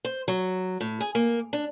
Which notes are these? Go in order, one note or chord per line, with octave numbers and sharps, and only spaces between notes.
C5
F#3
A2
G#4
A#3
D4